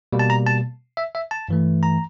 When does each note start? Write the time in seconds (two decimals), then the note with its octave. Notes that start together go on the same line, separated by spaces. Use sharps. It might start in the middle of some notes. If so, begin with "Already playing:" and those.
0.13 B2 G3 A#3
0.19 A5
0.30 A#5
0.46 A5
0.97 E5
1.15 E5
1.31 A5
1.49 G2 E3 A3
1.83 A#5